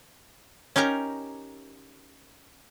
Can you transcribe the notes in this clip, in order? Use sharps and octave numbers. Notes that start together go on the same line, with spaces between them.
C#4 D#4 G4 A#4 A#5